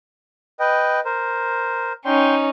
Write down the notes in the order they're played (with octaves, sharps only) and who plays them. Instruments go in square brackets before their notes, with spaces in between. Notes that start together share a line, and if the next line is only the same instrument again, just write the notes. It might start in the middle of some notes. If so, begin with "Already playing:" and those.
[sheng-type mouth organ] B4 D#5 G5
A#4 C5
[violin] C#4 D#4 [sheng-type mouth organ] G5 C6